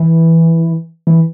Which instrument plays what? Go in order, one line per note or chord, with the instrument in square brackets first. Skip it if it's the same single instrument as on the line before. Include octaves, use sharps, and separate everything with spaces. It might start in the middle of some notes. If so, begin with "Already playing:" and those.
Already playing: [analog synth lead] E3
E3